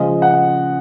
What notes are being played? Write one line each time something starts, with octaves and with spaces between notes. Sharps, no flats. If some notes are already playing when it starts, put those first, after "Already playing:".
Already playing: C#3 F3 G#3 D#5
F#5